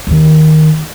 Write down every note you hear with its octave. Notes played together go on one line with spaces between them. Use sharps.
D#2 D#3